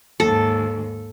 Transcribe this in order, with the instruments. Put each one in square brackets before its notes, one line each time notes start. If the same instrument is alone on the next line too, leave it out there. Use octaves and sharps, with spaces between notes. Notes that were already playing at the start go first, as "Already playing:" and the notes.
[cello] D#2 G#2 [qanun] A4